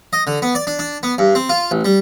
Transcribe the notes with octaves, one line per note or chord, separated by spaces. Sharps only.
D#5
D3
B3
D5
D4
D4
B3
G2
C4
F4
A1
G3